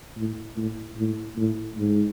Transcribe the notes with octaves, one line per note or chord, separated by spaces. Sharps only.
A2
A2
A2
A2
G#2